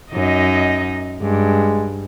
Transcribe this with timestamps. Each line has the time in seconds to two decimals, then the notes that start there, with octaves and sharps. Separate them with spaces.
0.12 F#2 D#4 D#5
1.22 G2 G#3